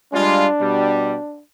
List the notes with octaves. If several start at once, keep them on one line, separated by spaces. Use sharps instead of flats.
G3 G#3 D4 F4
B2 G3